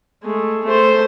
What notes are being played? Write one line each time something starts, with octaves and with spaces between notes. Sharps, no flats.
G#3 A3
A3 C5